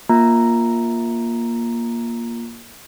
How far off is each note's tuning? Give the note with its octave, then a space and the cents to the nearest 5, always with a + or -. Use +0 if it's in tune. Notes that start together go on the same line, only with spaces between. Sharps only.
A#3 +10 F4 +5 A#5 +0